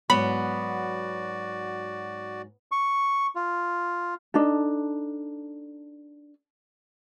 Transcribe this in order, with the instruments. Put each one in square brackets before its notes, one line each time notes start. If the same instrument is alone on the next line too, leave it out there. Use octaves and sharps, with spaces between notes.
[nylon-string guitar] G#2 F#3 [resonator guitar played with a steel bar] B3 [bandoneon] F#4 D5 [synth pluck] B5
[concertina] C#6
F4
[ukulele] D4 D#4 A4